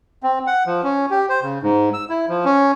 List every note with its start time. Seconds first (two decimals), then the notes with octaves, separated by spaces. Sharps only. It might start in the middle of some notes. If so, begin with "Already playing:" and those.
0.23 C4
0.47 F#5
0.66 F3
0.84 C#4
1.11 G4
1.29 C5
1.42 C#3
1.63 G#2
1.94 E6
2.10 E4
2.29 F3
2.45 C#4